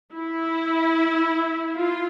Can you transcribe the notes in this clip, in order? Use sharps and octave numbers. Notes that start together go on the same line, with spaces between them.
E4
F4